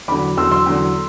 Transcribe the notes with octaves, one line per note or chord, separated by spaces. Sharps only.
E2 D3 F#3 B5 D6
E2 D3 F#3 C6 E6
C6 E6
E2 D3 F#3